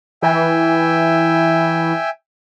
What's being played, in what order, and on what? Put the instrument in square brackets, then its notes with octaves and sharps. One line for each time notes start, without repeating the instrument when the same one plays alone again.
[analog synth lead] E3 [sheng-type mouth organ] E5 G5 G#5